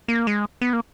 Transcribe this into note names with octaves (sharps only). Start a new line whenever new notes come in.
A#3
G#3
B3
A#3